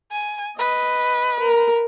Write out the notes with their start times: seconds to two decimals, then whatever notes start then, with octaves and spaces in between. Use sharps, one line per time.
0.11 G#5
0.58 B4 D#5
1.39 A#4